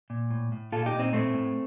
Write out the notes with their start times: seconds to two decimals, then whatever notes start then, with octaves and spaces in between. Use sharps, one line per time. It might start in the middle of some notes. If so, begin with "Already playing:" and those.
0.10 A#2
0.30 A2
0.52 A2
0.72 A#2 F4 A4
0.86 D#4 G4
0.93 A#2
0.99 C4 D#4
1.13 A2 A3 C4
1.34 A2